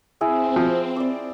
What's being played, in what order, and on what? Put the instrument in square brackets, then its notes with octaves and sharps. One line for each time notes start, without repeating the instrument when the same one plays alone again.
[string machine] C4 [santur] E4 G#4 F#5
[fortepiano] F3
[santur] D5 D6